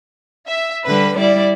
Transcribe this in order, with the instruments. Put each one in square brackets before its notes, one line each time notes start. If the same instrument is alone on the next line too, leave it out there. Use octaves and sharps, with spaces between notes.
[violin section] E5
[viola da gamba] D3 G3 [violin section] B4
[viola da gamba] G3 E4 [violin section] D5